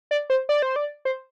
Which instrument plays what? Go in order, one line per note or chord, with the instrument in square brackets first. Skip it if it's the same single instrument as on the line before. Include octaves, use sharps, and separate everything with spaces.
[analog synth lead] D5
C5
D5
C5
D5
C5